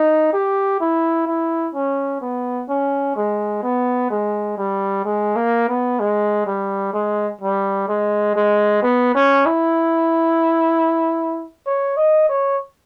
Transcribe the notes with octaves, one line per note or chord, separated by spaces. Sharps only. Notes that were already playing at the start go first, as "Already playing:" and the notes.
Already playing: D#4
G4
E4
E4
C#4
B3
C#4
G#3
B3
G#3
G3
G#3
A#3
B3
G#3
G3
G#3
G3
G#3
G#3
B3
C#4
E4
C#5
D#5
C#5